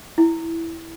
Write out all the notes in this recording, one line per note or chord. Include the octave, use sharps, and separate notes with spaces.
E4